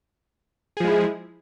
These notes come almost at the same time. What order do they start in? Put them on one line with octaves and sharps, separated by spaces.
G#4 F3 G#3 E4